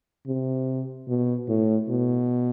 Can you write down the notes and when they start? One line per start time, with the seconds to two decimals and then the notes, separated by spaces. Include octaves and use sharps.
0.27 C3
1.08 B2
1.48 A2
1.89 B2